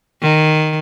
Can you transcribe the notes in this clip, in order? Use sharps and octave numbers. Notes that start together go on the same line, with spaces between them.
D#3